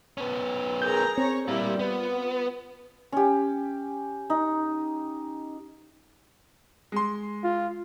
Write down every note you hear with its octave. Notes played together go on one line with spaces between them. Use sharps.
B3 C#4
G#4 A#4 A#5 G6
C4 C#5
G3 A#3 E4 F4 G4
B3 F4
C#4 G4
D#4
G#3 C6
F4